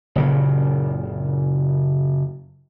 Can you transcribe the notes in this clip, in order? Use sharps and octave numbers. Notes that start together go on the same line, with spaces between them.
F#1 A#2 C#3